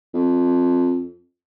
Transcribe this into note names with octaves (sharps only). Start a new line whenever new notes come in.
F2